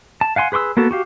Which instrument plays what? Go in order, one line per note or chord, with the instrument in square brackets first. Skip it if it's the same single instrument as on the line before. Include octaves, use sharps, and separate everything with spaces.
[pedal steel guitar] A5
F5 F#5 G#5 C6
G#4 B4 C6 C#6 E6
A#3 B3 F#4 A4
F#4 G4 F5